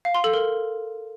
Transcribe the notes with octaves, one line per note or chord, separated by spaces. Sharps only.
F5
C6
A4
A#4